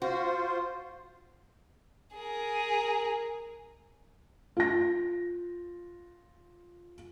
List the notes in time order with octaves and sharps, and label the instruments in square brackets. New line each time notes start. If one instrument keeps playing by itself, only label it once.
[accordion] F4 C5 [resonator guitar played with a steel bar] F#4
[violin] G#4 A#4
[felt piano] F4 A#6